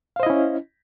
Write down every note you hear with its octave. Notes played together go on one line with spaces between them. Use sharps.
C#4 E4 C5 D#5 F5